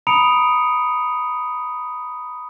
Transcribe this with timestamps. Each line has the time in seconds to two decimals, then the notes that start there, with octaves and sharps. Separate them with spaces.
0.07 A#5 B5 D#6 C#7 D7 F7